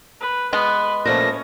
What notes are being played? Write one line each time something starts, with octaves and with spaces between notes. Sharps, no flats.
B4
G#3 B3 B4
A#2 F3 A3 C#4 A#6